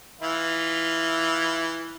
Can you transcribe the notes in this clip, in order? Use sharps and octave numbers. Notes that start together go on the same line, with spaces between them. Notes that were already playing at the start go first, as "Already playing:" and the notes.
E3 E4 F4